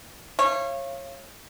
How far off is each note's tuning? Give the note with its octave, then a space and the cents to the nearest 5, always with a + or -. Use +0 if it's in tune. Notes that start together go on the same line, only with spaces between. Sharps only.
C#5 -25 F5 -35